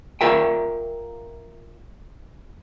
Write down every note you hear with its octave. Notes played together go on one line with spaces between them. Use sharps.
F4 A#4 E5 G5